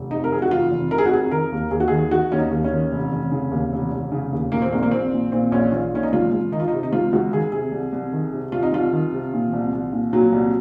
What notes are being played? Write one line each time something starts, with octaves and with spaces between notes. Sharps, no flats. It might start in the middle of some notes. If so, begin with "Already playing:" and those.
Already playing: F1
C3 D#4
A#4
F2 G#4
F#4
F1 F4
F1
C3 A#4
G#4
F#4
F2 G#4
D#3 A#4
D#2
D#2 G#4
F#4
D#3 G#4
D#3 F#4
D#2 C#4
D#4
D#2
C#4
D#3
F1
F1
C#3
D#2
F1
F1
C#3
D#2
A#2 A#3
C4
A#1 A#3
A#3
A#1 C4
A#2
A#2 C4
A#1 C#4
A#1 F4
A#2 C#4
D#4
C#2 F4
C#2
D#3 D#4
F4
D#4
C3
D#4
C#2 F4
C#2 F#4
D#3 G#4
C3 G#4
C2
C2
D#3
C3
C2 F4
D#4
C2 F4
D#3
C3
A#2
C2
C2
A#2
A#2 F#3
C2